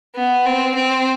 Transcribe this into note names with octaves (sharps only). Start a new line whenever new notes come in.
B3
C4
C4